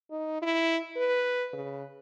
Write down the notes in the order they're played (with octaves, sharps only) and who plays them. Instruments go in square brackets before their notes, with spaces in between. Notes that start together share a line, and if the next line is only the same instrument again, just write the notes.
[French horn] D#4
E4
B4
C#3